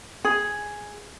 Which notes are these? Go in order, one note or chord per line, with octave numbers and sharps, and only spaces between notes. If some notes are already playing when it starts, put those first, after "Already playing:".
G#4